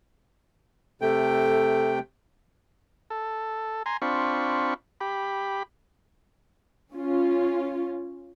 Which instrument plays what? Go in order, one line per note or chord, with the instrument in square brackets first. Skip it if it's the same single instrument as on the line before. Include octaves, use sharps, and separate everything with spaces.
[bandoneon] C3 A3 G5 [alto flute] A4
[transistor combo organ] A4
G#5 A#5 C6
C4 D4 F4 B5 C#6
G4 B5
[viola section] C#4 F4